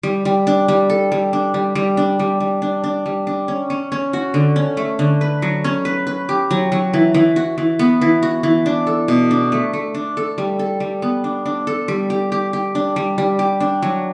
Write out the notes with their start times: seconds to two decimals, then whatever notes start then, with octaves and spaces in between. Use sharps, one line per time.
0.03 G3
0.25 G3
0.47 D4
0.68 G3
0.90 A4
1.12 G3
1.33 D4
1.54 G3
1.75 G3
1.97 D4
2.19 G3
2.40 G3
2.62 D4
2.84 D4
3.06 G3
3.27 D4
3.48 C#4
3.70 C#4
3.92 C#4
4.13 F#4
4.34 D3
4.56 C#4
4.77 A3
4.99 D3
5.21 B4
5.42 F#3
5.64 C#4
5.85 B4
6.07 B4
6.29 G4
6.51 F#3
6.72 F#3
6.93 E3
7.14 E3
7.36 F#4
7.58 E3
7.79 B3
8.01 E3
8.23 F#4
8.43 E3
8.66 D4
8.87 A4
9.08 B2
9.31 D4
9.52 A3
9.73 A3
9.95 D4
10.17 A4
10.38 G3
10.59 A4
10.80 G3
11.02 B3
11.24 D4
11.46 D4
11.67 A4
11.88 G3
12.10 G4
12.32 G4
12.53 G4
12.75 D4
12.96 G3
13.18 G3
13.39 G4
13.60 D4
13.83 F#3